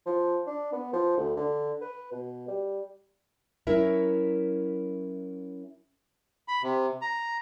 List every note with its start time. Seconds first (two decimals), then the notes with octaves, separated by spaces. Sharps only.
0.07 F3
0.47 D4
0.72 B3
0.93 F3
1.18 D2
1.37 D3
1.81 B4
2.12 B2
2.48 G3
3.67 F#3 C#4 E4 A#4 E5
6.48 B5
6.63 C3
7.01 A#5